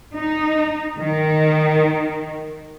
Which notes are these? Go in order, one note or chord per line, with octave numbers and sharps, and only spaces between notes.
D#4
D#3